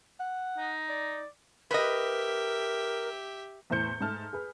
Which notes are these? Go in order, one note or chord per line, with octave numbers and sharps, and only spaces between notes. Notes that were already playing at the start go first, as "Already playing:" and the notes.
F#5
D#4
D5
G4 A#4 B4 D#5 E5
E2 A2 C5 G6 C#7
G#2 A3 A5 F6
G#4 B4